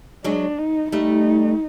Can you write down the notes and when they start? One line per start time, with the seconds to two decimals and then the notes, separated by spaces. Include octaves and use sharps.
0.24 F#3 G#3 D4
0.58 D#4
0.92 G3 A3 D#4